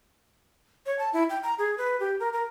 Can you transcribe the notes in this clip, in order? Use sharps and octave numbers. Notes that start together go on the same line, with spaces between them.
C#5
A5
E4
G5
A#5
G#4
B4
G4
A#4
A#4